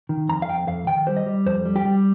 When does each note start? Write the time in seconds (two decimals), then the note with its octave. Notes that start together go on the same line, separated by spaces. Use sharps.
0.09 D#3
0.29 F2 A#5
0.42 F5
0.49 F2 G5
0.68 F2 F5
0.87 D#3 G5
1.07 G3 C5
1.17 D#5
1.26 G3
1.46 F2 C5
1.65 G3
1.76 G4
1.85 G3